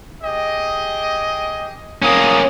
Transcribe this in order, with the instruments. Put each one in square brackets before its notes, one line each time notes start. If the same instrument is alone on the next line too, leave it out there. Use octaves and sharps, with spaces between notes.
[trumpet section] G4 G#4 D#5
[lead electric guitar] A#3 C#4 [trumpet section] D#6